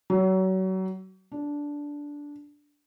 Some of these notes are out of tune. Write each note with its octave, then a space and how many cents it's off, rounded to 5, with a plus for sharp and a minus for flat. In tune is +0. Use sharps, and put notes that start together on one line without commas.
F#3 +30
D4 -10